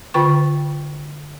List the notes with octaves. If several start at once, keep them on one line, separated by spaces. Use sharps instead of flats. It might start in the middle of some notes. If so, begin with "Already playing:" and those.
D3 F4 B4 G5 C#6